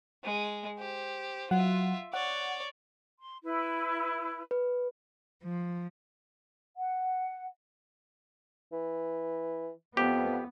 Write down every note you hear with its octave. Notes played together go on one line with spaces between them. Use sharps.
G#3
G4 C5
F#3 F4 E5 F#5
C#5 D5 F#5
C6
E4 B4
B4
F3
F#5
E3
F2 B3 G4